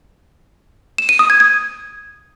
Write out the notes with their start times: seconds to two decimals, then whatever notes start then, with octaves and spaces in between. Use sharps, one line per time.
0.98 E7
1.09 D#7
1.19 D#6
1.30 G#6
1.40 G#6